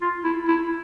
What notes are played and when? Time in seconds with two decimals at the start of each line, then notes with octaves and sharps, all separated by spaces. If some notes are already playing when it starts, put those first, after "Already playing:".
0.01 F4
0.24 E4
0.48 E4